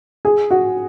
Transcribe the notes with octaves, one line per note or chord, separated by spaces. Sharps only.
G#4
F#4